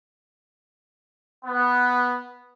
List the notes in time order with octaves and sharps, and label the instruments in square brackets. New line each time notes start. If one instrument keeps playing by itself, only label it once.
[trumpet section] B3